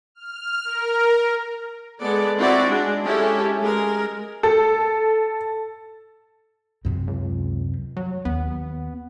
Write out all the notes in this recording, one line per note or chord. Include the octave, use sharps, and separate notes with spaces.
F6
A#4
G#3 B3 A4 D5
C4 E4 F#4 D5
G#3 D4
G#3 C#4 E4 G4 A4
G#3 A#4
A4
F#2 C3
C#2
F#3
D#2 B3